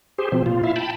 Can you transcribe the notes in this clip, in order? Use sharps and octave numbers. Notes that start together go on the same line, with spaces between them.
G4 G#4 C5
B2 F3 C4
A#2 F4
E4 E5 F5
G5 A5 B5